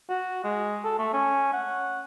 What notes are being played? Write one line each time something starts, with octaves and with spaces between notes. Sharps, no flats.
F#4
G#3
A4
A3
C#4
F#5